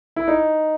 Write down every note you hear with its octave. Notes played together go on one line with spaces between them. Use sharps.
E4
D#4